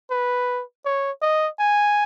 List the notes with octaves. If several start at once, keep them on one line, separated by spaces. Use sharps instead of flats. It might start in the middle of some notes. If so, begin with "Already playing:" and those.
B4
C#5
D#5
G#5